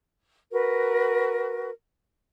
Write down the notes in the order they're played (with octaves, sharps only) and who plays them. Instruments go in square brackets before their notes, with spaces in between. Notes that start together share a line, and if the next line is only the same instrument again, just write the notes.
[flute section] F#4 A#4 B4